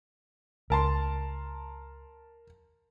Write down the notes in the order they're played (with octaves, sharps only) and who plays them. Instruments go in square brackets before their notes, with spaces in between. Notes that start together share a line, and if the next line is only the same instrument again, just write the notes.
[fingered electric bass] C#2 [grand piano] A#4 A5 C6